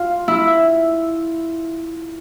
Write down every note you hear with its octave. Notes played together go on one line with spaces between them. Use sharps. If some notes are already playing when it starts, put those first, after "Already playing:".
Already playing: F4
E4